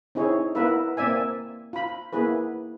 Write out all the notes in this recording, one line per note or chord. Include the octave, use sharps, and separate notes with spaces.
C4 D#4 E4 G#4 C#5
B3 E4 F4 A#4 B4 E5
A#3 C4 D5 E5 G#5
F4 B5
A#3 B3 E4 G#4 B4